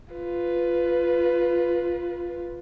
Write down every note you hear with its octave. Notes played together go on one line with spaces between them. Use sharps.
F4 B4